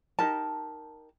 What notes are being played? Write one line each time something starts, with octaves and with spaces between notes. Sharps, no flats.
D#4 G4 A#4 A5